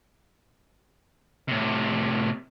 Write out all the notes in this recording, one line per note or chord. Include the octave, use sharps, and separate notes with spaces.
A2 C3